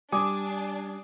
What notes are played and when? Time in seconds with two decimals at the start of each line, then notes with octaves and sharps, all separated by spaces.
0.12 G3 D4 G#5 D6 D#6